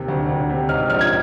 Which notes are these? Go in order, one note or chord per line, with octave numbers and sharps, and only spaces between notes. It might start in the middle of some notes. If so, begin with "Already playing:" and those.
Already playing: D#2 C3
D2
D2
C3
G#2 F6
A#1 F6
G#6